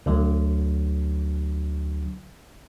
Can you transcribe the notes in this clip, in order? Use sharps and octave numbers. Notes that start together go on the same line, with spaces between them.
D2 D3 F#3